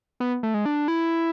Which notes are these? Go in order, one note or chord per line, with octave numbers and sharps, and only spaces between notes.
B3
A3
G#3
D4
E4